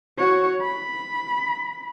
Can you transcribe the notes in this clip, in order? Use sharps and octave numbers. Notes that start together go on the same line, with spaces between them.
F#4 C#5
B5